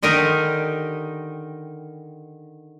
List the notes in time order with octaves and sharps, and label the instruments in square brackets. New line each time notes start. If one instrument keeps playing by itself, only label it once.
[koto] D3 D#3 D#4 G4 A#4